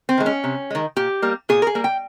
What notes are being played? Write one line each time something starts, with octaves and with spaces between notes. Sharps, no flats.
C4
D#3 G#3
C#4
C3
D#3 G#3
A#2 G4
G3 A#3
A#2 G#4
A#4
G#4
G3 A#3
G5